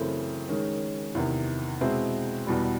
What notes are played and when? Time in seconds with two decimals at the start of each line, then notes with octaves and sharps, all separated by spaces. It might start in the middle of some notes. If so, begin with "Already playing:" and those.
Already playing: F#2 C#3 E3 A3 C4
0.49 D#3 G#3 C#4
1.15 E2 C3 D#3
1.81 B2 G#3 C4 E4
2.47 E2 B2 G3